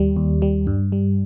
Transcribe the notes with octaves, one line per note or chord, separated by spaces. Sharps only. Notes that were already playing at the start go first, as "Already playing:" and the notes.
Already playing: D#2 G3
D#2
G3
G2
G3